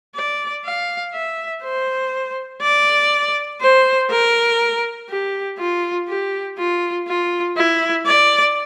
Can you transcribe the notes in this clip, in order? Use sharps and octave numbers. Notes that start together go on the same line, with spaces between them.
D5
F5
E5
C5
D5
C5
A#4
G4
F4
G4
F4
F4
E4
D5